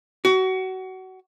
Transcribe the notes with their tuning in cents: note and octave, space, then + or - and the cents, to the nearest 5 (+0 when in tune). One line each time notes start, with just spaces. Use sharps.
F#4 +25